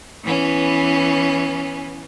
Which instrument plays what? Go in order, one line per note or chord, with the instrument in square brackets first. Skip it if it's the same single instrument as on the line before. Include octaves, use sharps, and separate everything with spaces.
[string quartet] E3 B3 C#4